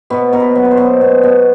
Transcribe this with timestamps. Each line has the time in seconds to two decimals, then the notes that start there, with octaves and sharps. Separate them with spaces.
0.10 B2 B4
0.33 B2 A#4
0.40 B4
0.55 F#3
0.65 B4
0.71 C5
0.77 B2
1.01 B2
1.23 B2